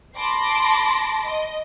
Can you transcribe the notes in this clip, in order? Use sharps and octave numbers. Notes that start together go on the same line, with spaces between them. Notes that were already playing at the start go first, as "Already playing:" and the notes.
A5 B5 C6 D6 A#6
D#5